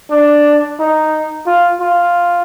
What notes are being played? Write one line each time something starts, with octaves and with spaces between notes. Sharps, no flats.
D4
D#4
F4
F4